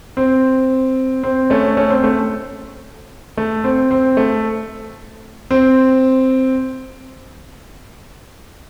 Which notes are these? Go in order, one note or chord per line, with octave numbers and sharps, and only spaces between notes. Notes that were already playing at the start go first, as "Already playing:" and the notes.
C4
C4
A3 C#4
A3 C#4
C4
A3
A3
C4
C4
A3
C4